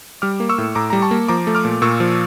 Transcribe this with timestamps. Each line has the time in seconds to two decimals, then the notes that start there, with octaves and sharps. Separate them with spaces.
0.22 G3 D6 F6
0.40 A#3
0.49 C#6 E6
0.58 A2
0.75 A2 A#5 D6
0.90 G3 A#5
1.02 A5 C#6
1.11 A#3
1.28 F3 A#5 D6
1.47 A3
1.55 D6 F6
1.65 A#2
1.82 A#2 C#6 E6
2.00 F3